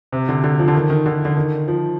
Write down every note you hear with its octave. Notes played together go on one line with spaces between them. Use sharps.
C3
D3
D3
F3
D3
D#3
D#3
D3
D3
D#3
F3